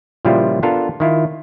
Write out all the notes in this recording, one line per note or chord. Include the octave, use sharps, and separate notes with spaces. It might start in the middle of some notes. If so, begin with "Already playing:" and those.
A#2 C#3 F3 G3 E4 F4
B3 D4 F4 A4 A#4
D#3 E4 F4